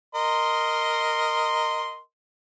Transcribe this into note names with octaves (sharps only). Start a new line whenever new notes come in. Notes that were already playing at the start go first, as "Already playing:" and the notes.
A#4 D#5 C6